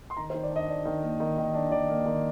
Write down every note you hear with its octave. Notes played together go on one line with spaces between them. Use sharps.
C6
D#3 A#5
C5
D#3
D5
D4 D#5
D4
D#3
A#3
D#3
D#3
D4
D#3 D5
A#3
D#3